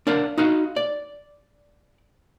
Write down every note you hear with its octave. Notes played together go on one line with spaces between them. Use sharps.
D4 A#4 D5 F5 F#5
D#4 F#4 F5
D5